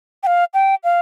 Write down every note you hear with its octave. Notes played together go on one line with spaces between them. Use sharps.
G5
F5
G5
F5